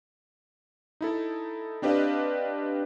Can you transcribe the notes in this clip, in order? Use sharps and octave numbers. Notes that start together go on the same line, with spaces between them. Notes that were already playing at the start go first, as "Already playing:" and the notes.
D#4 E4 A4
C4 D4 G4 B4 D#5 F5